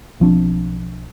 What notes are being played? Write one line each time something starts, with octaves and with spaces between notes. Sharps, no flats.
B1 F3 C4 D4